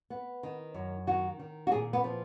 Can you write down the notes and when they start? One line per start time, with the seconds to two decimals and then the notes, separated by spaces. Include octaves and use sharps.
0.10 B3
0.43 D#3
0.74 F#2
1.07 D#3 F#4
1.39 D#3
1.67 F#4
1.72 A#2 G#4
1.93 B3
2.04 F3